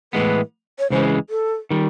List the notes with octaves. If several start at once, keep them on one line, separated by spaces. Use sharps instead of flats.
A2 E3 G#3 B3 B4
C#5
C#2 C#3 E3 G#3 C5
A4
D#3 G3